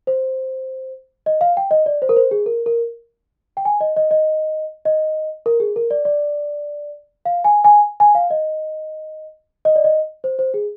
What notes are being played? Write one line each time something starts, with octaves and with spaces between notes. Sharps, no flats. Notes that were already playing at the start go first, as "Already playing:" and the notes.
C5
D#5
F5
G5
D#5
D5
C5
A#4
C5
G#4
A#4
A#4
G5
G#5
D#5
D#5
D#5
D#5
A#4
G#4
A#4
D5
D5
F5
G#5
G#5
G#5
F5
D#5
D#5
D5
D#5
C5
C5
G#4